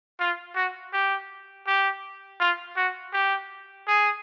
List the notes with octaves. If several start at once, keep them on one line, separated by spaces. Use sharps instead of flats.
F4
F#4
G4
G4
F4
F#4
G4
G#4